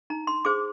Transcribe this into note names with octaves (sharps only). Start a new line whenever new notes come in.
D#4 A#5
C6
G#4 C5 D6